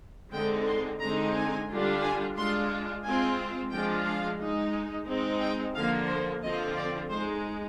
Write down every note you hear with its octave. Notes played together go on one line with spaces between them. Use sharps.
D3 G#3 C4 D#4 G5
C6
D3 G#3 C4 D#4 A#5
G#5
D3 G3 D4 F4
G#5
G#3 D4 F4 C6
G#3 C4 F4 G#5
F3 G#3 D4 F4 G5
F5
G#3 D#4
G#3 C4 D#4
G5
D3 F3 A#3 F5
C5
D3 F3 C4 F4 D#5
D5
G#3 D#4 C5